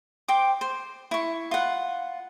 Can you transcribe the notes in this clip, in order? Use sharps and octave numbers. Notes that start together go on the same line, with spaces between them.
C5 G5 D6
C5
E4 C#6
F4 F#5